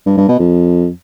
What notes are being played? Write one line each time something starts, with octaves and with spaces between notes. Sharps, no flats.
G2
G2
B2
F2